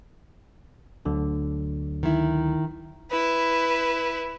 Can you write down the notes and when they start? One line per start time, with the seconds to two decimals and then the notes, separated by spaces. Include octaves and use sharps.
1.05 D2 D3 F#3
2.03 D#3 E4
3.09 E4 B4